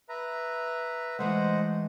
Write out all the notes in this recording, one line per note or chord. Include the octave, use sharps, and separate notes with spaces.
B4 E5 A#5
E3 G#3 A3 C5 D#5 F#5